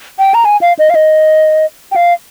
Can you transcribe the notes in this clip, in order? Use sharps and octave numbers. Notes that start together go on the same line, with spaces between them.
G5
A#5
G#5
F5
D#5
F5
D#5
G5
F5